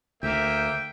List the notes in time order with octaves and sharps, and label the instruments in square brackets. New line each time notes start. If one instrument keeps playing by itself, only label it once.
[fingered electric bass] D2 [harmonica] A#3 E5 [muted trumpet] G5